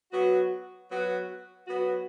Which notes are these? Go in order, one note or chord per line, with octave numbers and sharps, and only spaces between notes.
F#3 B3 F#4
F#3 B3 F#4
F#3 B3 F#4